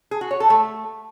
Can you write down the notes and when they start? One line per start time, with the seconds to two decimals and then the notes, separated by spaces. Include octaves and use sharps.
0.11 G#4
0.21 F#4
0.31 C#5
0.40 A4
0.50 A3